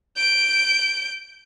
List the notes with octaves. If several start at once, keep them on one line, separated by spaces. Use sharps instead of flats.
G6 D7